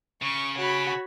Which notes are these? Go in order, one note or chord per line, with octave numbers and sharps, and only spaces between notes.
C#3 C#6
F#4 C#5 B5